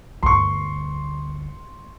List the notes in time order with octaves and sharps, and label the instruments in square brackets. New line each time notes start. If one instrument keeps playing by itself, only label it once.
[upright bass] G1 D2 [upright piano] C6 C#6